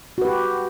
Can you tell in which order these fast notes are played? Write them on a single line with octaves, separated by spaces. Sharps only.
F#4 B4 G4